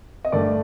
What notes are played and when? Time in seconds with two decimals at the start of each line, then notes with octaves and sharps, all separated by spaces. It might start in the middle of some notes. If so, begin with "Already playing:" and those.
0.25 D#5
0.32 G2 D3 A3 D5